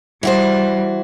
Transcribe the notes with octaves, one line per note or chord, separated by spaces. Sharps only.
E3 G3 F#4 C5